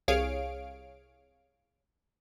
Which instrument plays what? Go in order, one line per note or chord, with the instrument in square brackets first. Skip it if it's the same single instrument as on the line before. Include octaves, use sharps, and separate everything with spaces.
[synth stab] C2 G#4 C#5 F5 D7